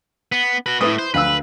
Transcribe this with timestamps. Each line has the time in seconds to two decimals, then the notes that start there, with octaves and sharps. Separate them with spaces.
0.32 B3
0.66 F#4 B4
0.81 A2 E4 B4 D#6
0.99 C5
1.14 D2 B4 F5 E6